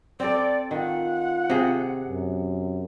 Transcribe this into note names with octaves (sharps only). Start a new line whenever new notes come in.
C4 A4 D5
D#3 F4 F#5
C3 G#4
F#2